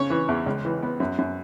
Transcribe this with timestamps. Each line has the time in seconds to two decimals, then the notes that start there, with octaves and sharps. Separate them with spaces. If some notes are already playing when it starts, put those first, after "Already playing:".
Already playing: C#3 C#5
0.10 E3
0.28 E2
0.46 C#2
0.65 E3
0.83 B3
1.00 F#2
1.18 F#2